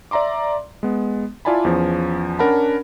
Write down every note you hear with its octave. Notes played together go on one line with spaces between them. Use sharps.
D5 E5 A#5 C6 D6
G#3 B3
E4 F4 D5 G#5 A5 B5
E2 F3 C#4
C#4 D4 A#4 F#5 A5 B5